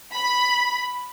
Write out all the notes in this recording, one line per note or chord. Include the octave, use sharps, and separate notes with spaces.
B5